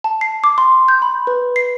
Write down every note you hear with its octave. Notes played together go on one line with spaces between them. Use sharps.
A5
C7
D6
C6
G6
B5
B4
C7